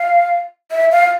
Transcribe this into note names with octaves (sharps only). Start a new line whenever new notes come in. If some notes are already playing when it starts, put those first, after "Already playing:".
Already playing: F5
E5
F5